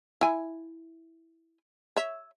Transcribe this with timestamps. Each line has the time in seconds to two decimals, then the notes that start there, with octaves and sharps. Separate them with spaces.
0.21 E4 G#5
1.96 C#5 E5